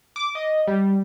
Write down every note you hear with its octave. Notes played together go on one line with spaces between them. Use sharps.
D6
D#5
G3